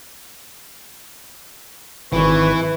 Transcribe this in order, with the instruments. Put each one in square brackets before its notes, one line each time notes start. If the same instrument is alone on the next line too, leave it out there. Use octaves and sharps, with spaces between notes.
[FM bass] G#1 [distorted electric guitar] E3 [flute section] B4 C#6